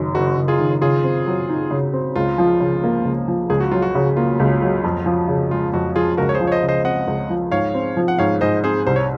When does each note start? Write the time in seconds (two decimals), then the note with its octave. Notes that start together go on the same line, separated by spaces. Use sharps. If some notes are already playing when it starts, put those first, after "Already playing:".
Already playing: F#1 F#2 D#3
0.14 F#1 F#4
0.37 F#1
0.48 F4 G#4
0.59 D#3
0.81 C#3 F4 G#4
1.04 C4
1.26 F#3
1.49 D#4
1.71 C#3
1.93 C4
2.15 C#2 F4
2.38 F3
2.60 C#3
2.83 A#3
3.05 C#2
3.28 F3
3.50 C#2 G#4
3.60 F#4
3.71 F#3 F4
3.82 F#4
3.95 C#3
4.17 A#3 F4
4.39 C#2
4.62 F#3
4.84 F2
5.06 F3
5.28 C#3
5.51 G#3 F4
5.73 F2 F#4
5.96 F3 F4 G#4
6.17 C#2 F#4 A#4
6.29 C#5
6.35 G#4 C5
6.41 F3
6.47 C#5
6.52 C5 D#5
6.62 C#3
6.68 C5 D#5
6.85 C4 D#5 F#5
7.07 C#2
7.30 F3
7.51 G#2 C#5 F5
7.74 C4
7.97 F3
8.08 F#5
8.19 G#2 C#5 F5
8.41 G#2 C5 D#5
8.64 C4 G#4 C5
8.87 C2 C5
8.96 C#5